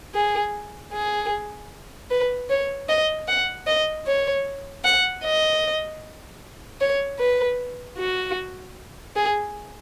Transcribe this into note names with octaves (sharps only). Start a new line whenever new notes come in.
G#4
G#4
B4
C#5
D#5
F#5
D#5
C#5
F#5
D#5
C#5
B4
F#4
G#4